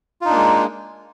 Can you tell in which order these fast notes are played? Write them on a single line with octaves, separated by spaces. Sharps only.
F4 D#4 D4 A#3 G#3